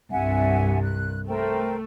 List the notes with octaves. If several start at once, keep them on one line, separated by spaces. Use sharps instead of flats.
C2 G2 E5 F#5 G#5
F#6
A3 A#4 C5 G5